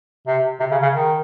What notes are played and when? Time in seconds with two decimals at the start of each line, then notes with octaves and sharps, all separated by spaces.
0.27 C3
0.60 C3
0.71 C#3
0.82 C#3
0.93 D#3